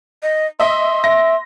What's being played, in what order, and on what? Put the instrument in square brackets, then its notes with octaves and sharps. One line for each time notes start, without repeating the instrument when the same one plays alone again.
[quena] D#5
[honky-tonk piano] D#5 E5 [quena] C6
[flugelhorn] E5 [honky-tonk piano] A#6